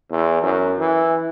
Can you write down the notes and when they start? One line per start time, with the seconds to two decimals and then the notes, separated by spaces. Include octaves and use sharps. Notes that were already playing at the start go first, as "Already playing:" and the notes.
0.10 E2
0.42 F#2
0.79 E3